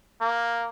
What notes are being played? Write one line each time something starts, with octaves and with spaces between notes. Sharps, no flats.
A#3